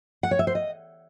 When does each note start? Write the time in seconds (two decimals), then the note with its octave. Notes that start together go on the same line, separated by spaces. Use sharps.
0.23 F#5
0.31 C#5
0.39 E5
0.47 C5
0.55 D#5